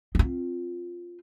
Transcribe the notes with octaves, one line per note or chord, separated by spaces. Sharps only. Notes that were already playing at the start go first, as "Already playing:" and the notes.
C4 F4